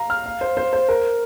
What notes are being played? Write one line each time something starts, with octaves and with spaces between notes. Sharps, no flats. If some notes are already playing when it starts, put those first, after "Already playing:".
Already playing: F5 A#5
F6
F5
C5
C5
C5
A#4